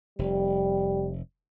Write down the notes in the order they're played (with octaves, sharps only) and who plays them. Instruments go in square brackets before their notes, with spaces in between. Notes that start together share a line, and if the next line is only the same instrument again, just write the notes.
[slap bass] F1 [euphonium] G3